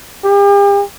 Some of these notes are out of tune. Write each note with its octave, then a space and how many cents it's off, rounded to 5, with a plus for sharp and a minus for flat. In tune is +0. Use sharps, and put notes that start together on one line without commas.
G4 +40